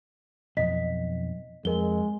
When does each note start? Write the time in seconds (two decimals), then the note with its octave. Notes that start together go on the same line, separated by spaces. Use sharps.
0.57 B1 F2 D#5 B6
1.65 F2 G#3 A#4 G7